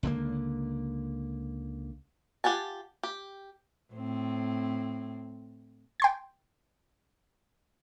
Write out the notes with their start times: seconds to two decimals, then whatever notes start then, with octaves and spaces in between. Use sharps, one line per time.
0.03 C#2 D3 A3 A#3
2.44 F4 G4 F#5 G#5 A5
3.03 G4
3.93 A2 C4
6.00 G5 C6 G#6